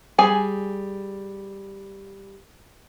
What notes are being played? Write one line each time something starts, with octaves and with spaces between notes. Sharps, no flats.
G3 G#4 G#5